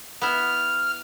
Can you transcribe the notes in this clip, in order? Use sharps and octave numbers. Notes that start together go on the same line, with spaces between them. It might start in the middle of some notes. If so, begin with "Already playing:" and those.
B3 E4 F6